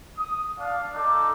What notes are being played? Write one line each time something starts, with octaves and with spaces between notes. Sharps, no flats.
D#6
D4 F5
D#4 A4 D6